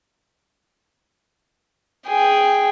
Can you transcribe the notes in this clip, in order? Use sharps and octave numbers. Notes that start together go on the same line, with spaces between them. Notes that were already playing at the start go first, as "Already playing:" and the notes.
G#4 G5